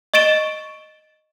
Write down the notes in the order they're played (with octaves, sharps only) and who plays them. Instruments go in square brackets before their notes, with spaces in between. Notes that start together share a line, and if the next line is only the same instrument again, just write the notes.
[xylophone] D#5 C#6 A6 D7 E7 G7